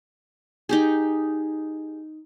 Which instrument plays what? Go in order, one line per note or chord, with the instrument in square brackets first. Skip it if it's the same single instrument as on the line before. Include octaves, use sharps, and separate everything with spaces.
[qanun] D#4 G4 G#4